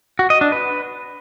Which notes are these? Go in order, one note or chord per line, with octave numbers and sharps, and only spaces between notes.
F#4
D#5
D4
B4